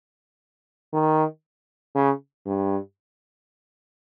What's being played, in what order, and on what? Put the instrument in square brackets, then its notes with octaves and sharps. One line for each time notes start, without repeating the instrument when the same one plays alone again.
[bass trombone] D#3
C#3
G2